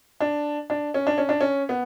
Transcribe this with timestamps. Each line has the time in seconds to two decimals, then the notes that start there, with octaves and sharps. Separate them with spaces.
0.20 D4
0.70 D4
0.94 C#4
1.07 D4
1.18 C#4
1.29 D4
1.41 C#4
1.69 B3